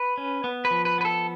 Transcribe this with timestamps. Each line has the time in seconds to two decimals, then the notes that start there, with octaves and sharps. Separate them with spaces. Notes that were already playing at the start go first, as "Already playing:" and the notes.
Already playing: B4
0.18 C#4
0.44 B3
0.65 B4
0.71 F3
0.85 B4
0.98 B3 B4
1.05 A4